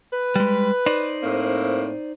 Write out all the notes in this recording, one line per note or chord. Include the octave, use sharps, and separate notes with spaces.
B4
G3 G#3
D#4 C5 D5
A2 A#3 C4